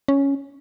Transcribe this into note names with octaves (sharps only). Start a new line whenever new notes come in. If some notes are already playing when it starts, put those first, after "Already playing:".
C#4